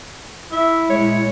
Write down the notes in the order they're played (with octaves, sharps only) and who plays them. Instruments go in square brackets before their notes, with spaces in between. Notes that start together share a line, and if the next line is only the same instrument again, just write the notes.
[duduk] E4 [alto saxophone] E5
[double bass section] A#2 G#3 [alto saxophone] C#5